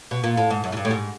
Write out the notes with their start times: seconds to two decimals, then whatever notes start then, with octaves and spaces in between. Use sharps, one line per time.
0.11 B2
0.24 A#2
0.37 A2
0.50 G#2
0.64 F#2
0.72 G#2
0.77 G2
0.85 A2
0.91 G#2